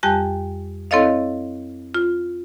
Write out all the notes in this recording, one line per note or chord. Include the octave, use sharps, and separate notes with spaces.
F2 G3 G4 G5 G#5 F#6
C4 E4 A4 C#5 D#5 F5
F4